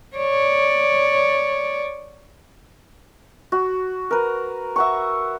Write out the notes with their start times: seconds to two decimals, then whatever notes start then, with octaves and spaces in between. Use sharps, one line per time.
0.17 C#5 D5
3.52 F#4
4.11 A#4 B4
4.76 E5 F#5 C#6